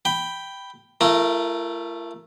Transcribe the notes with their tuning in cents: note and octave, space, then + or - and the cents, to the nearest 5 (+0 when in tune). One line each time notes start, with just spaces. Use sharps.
G5 +0 B5 +0
A3 +0 F4 -45 A#4 +0